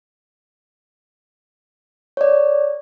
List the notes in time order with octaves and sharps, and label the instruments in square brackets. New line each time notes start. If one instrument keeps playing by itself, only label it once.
[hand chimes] C#5 D5